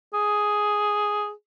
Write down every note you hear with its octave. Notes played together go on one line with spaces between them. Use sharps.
G#4